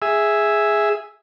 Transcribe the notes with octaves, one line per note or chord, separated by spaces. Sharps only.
G#4 E5